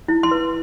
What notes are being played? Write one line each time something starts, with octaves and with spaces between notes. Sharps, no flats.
E4
C6
B4